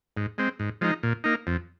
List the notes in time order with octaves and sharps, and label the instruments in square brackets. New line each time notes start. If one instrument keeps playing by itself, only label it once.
[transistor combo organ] G#2
G#3 C4
G#2
F3 G#3 D#4
A#2
A#3 D#4
F2